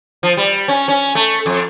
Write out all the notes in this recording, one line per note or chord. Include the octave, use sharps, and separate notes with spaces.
F3
G3
C#4
C#4
A3
F2